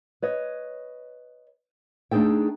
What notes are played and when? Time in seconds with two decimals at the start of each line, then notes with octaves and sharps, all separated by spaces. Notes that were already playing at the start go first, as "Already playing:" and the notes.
0.22 B4 C#5 D#5
2.11 A3 D4 D#4 G#4 A4 G5